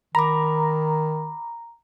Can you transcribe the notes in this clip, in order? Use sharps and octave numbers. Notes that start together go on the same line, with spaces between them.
D#3 A#5 B5 D6